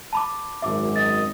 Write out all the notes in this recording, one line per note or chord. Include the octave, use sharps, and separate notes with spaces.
A5 B5 D6
G#1 F#2 E5 D6
D#5 A6